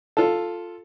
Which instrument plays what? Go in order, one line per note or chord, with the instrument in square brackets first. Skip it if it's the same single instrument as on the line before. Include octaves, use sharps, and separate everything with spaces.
[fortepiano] F4 A4